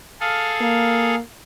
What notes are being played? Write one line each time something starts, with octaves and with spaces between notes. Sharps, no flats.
G#4 A4 F5
A#3